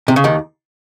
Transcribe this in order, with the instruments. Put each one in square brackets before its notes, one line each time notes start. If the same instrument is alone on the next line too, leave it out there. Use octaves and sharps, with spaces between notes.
[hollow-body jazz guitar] C3
C#3
D#2 D#3